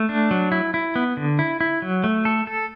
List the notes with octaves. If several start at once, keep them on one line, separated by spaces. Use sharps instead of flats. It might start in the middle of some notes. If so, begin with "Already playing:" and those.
Already playing: A3
D4
F#3
E4
E4
B3
D3
E4
E4
F#3
A3
A4
A4